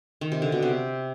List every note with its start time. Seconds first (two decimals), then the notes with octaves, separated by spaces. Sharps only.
0.21 D#3
0.32 C3
0.42 D3
0.52 B2
0.62 C3